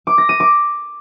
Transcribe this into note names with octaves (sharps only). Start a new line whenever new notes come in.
D6
A#6
D#7
D6